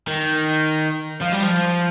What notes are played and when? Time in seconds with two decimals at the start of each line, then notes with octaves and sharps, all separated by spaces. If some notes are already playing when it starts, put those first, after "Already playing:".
0.08 D#3
1.21 F3
1.32 G3
1.43 F3